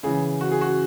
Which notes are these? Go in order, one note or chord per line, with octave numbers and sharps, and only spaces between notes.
C#3 E3 G#4
F#4
G#4
F#4